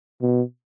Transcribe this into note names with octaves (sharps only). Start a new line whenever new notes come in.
B2